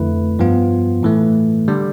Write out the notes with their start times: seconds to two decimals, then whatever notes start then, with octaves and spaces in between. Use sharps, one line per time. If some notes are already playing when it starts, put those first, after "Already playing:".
Already playing: F2 D3 A3 E4 B4
0.39 G2 F3 B3 F4
1.03 A2 E3 A3
1.68 D3 G3